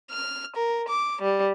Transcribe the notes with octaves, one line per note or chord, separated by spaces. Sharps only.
F6
A#4
D6
G3